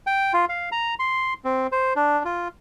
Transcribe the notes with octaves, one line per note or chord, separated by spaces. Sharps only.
G5
F4
F5
A#5
C6
C4
C5
D4
F4